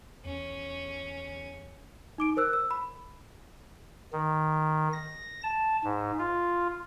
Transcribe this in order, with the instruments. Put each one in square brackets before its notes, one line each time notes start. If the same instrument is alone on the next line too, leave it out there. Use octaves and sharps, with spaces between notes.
[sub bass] E2 [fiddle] C#4
[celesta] D#4 D6 D7
A#4 C5 E6 F#6
E6
B5
[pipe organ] D#3
A#6
A5
G#2
F4